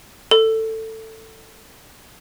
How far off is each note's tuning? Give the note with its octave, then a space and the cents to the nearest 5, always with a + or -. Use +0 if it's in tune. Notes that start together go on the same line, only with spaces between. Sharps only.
A4 +15